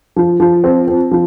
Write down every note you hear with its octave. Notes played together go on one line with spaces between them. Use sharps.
F3
F3
C4
C4
F3